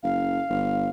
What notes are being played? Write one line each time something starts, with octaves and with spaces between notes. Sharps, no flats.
F#1 F5
G1